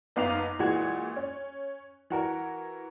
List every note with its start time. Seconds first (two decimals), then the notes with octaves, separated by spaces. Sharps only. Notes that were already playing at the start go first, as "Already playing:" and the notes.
0.16 F#1 B3 D#4 F5 D6 F7
0.59 A#2 E3 G#3 F#4 G#6
1.16 C#4
2.10 E3 F#4 A#4